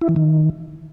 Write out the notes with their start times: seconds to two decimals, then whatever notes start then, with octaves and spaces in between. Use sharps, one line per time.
0.01 E4
0.09 E3
0.16 D#3